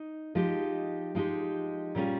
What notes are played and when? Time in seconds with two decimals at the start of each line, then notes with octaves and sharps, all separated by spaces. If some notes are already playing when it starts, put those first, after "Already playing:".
Already playing: D#4
0.35 F3 G#3 D#4 G4
1.15 F3 G#3 D#4 G4
1.95 A#2 G3 C#4 F4 G#4